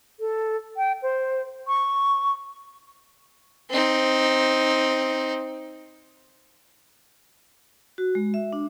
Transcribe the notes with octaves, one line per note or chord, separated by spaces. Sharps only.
A4
G5
C5
C#6
C4 D#4
F#4
G#3
E5
D4